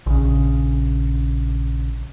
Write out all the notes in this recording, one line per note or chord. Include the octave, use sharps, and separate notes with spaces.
A#1 C#3